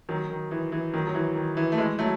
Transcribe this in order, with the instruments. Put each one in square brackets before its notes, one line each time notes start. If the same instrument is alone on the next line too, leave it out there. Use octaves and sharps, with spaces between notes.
[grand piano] D#3 F#3
D#3
E3
E3
D#3 F#3
F#3
E3
D#3
E3
A3
E3 G#3
F#3 A3